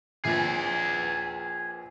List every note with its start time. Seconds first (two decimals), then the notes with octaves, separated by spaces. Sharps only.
0.25 A#1 A#2 G#4 B4 A6